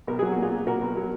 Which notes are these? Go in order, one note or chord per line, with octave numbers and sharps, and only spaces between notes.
B1 A#4
F#3 G#4
A#2 F#4
F4 G#4
A#2
A#2 F#4 A#4
B1
F#3